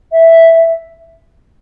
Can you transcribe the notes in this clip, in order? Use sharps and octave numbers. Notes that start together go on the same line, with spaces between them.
E5